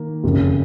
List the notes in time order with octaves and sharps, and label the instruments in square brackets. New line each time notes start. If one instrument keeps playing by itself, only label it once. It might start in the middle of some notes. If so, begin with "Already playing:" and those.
Already playing: [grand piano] D#3 A#3
F#1 F2 C#3